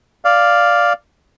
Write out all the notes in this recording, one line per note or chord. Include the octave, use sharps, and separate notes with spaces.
D5 F5